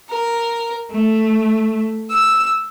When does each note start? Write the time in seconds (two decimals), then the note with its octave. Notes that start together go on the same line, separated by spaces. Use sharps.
0.10 A#4
0.91 A3
2.09 E6